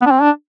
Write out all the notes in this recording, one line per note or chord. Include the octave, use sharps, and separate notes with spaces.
B3
D4
C4
D4